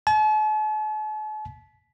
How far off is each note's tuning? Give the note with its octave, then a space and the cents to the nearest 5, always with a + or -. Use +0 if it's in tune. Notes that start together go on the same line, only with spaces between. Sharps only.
A5 -45